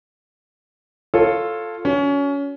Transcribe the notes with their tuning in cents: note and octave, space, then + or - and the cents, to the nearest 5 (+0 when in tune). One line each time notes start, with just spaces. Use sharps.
F4 +0 A4 +0 C#5 -15
C#4 +25 F#4 -5